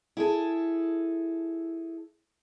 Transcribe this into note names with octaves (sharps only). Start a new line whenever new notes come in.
E4 G#4 A4